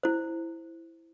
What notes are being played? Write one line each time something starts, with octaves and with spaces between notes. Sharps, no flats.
E4 C5